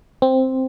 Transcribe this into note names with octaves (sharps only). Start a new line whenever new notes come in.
C4